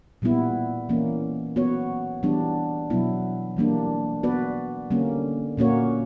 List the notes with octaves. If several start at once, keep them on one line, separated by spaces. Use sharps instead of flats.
A#2 G3 B3 E4
E3 A#3 C#4
B3 F#4 C#5
E3 G3 B3 D4
B2 F#3 B3 E4
E3 G3 A#3 D4
B3 F#4 B4 D5
D3 G3 A#3 C#4
A#2 A#3 C#4 F#4 C#5